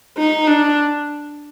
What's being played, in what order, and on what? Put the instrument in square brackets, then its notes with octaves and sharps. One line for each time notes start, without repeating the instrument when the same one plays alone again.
[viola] D#4
D4